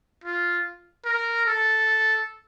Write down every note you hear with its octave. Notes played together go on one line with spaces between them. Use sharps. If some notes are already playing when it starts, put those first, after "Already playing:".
F4
A#4
A4